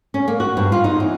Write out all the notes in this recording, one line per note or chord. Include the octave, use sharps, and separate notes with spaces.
C#4
A#3
F#4
G2
F4
D#4
E2